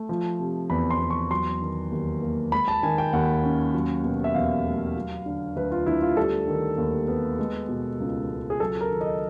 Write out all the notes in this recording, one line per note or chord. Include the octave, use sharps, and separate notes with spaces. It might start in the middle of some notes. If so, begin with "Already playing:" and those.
Already playing: A3
F3
C3
E2 B5
C6
E2
C#6
F#3 C6
D#3
D#2
A#3
G#3 B5
A5
D#3 G#5
G5
D#2 F#5
C#4
F#3
B2
E5
E2 F5
A3
F#3
D3
D2 B4
F4
D2 E4
F4
G3 A4
D#3
D#2
B3
G#3
B2
C#2
C#2
G#4
F#3 A4
A#4
D#3
D#5